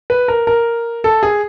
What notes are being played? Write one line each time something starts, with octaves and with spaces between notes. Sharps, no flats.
B4
A#4
A#4
A4
G#4